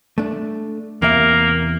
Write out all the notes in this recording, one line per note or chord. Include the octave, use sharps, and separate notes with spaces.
A3 D4
E2 C3 A#3 E5